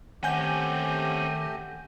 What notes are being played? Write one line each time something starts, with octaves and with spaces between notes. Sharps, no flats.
D#3 A3 C4 C#4 G4 F#5 G#5 G6